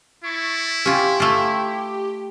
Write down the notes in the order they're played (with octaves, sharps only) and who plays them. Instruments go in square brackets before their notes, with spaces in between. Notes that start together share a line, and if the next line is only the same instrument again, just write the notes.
[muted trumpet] E4 [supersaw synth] C#6 A6
[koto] C#4 F4 [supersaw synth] G4
[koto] A3 F4